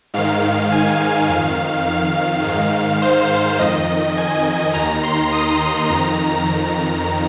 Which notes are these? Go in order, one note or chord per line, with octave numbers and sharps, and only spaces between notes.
G#2 D#3 F5
G#5
F2 D#3 F5
F5
G#2 D#3
C5
F2 D#3 D#5
G#5
D#2 D#3 A#5
C6
D#6
F2 D#3 A#5
A#5